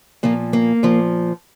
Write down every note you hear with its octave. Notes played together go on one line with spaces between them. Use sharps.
A#2 F3 A#3
A#3
A#2 F3